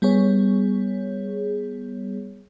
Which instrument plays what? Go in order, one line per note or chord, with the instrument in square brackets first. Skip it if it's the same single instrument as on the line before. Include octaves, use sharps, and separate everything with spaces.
[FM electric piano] G3 B3 G#4 C#5